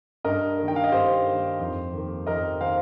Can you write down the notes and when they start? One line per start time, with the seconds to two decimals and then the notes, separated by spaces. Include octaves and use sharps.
0.25 G2 A#4 D#5
0.58 D#3 A#3
0.68 G5
0.76 F5
0.84 D#5
0.92 G2 G4 C5
1.26 D#3 A#3
1.60 F2
1.93 D#3 A#3
2.27 F2 A#4 D#5
2.61 D#3 A#3 C5 F5